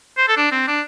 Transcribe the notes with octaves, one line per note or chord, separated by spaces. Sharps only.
C5
A4
D4
C4
D4